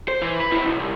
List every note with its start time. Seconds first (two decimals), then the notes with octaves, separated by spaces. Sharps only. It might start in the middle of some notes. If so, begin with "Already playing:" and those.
0.08 C5
0.22 E3
0.40 B4
0.52 G#2 E4
0.63 B1
0.80 C2